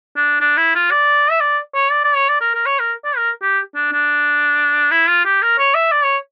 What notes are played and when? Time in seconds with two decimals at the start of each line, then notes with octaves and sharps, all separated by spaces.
0.16 D4
0.41 D4
0.57 E4
0.75 F4
0.91 D5
1.31 E5
1.41 D5
1.74 C#5
1.91 D5
2.04 D5
2.16 C#5
2.29 D5
2.41 A#4
2.54 A#4
2.66 C#5
2.80 A#4
3.05 D5
3.17 A#4
3.42 G4
3.75 D4
3.92 D4
4.92 E4
5.09 F4
5.25 G4
5.42 A#4
5.59 C#5
5.75 E5
5.92 D5
6.04 C#5